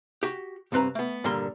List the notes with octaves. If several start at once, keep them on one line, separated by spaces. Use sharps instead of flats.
F#4 G4
C2 G2 C4 B4 A#5
A3 B3
G2 A#2 D3 G3 A#4 C6